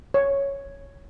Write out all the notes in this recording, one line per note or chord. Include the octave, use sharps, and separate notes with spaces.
C#5